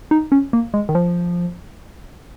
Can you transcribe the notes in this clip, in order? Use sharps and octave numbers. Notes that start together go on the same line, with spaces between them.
D#4
C#4
A#3
G#3
D#3
F3